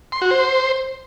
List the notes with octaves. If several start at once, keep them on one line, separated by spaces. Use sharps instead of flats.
C6
F#4
C5